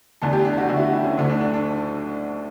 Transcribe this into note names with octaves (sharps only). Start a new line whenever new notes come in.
E2 D3 A3 A4
G4
D4
F#4
E2 D3 A3 F#4
E4
F#4
E4
C#4
D2 D3 A3
D4
D4
D4